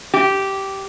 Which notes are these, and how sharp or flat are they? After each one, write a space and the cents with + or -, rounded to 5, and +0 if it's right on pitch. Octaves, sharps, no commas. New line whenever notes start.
G4 -10